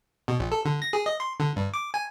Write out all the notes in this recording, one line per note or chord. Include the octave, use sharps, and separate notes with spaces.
B2
A#1
A4
D3
A#6
G#4
D#5
C6
D3
G2
D6
G#5